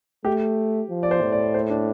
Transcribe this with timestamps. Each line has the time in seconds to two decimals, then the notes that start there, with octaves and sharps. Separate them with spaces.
0.25 A3 G4
0.90 F3
1.03 D5
1.11 C5
1.22 A2
1.32 D5
1.54 C5
1.70 D4